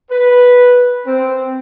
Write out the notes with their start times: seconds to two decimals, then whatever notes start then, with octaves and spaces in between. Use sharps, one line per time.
0.10 B4
1.07 C4